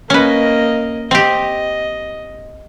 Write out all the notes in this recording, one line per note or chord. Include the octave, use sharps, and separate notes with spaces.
A#3 C#4 B4 D#5
C4 G4 D#5